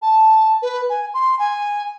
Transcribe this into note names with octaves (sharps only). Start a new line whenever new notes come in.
A5
B4
G#5
C6
G#5